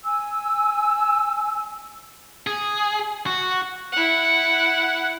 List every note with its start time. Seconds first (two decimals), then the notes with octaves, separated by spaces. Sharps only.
0.04 G#5 E6
2.47 G#4
3.26 F#4
3.92 E4 F#5